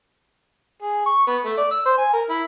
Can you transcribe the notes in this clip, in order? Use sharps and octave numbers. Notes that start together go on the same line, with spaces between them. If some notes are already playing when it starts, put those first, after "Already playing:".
G#4
C#6
B3
A3
D5
E6
C5
G#5
A#4
E4